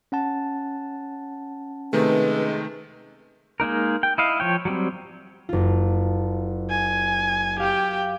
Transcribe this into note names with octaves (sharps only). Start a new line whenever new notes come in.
C#4 F#5 A5
C3 D#3 G#3 A3 B4
G#3 A#3 D#4 A#4
G5
E4 D#5 F5
F3 C#5 G5
F#3 G3 C4
F#1 F4
G#5
G4 F5 G5